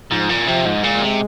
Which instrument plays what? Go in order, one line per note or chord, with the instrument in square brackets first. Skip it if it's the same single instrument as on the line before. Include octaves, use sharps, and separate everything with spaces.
[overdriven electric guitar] G#2 [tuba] F3
[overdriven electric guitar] A#2
[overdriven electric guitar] C3 [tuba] F3
[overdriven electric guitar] G#2
[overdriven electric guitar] A#2 [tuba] G#3
[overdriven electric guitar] C3